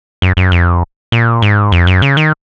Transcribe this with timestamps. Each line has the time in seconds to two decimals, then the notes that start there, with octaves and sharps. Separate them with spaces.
0.22 F#2
0.37 F#2
0.52 F2
1.12 A#2
1.42 G#2
1.72 F2
1.87 F#2
2.02 C#3
2.17 D#3